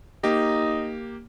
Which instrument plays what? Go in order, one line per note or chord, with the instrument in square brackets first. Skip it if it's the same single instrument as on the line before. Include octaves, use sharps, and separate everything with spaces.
[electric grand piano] A#3 G4 [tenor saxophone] D#4